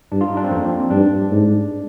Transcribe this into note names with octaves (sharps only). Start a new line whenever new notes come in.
G2 D4
F4
D#4
D4
C4
F2 A#3
G2 D4
G#2